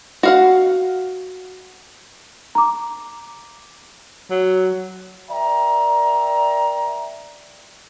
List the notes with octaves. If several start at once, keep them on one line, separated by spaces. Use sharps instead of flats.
F#4 F5 F#5
A#5 D6
F#3
A#4 D5 E5 G5 A#5